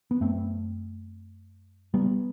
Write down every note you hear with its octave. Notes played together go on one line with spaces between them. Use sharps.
B3
F#2 A3 C4
G3 B3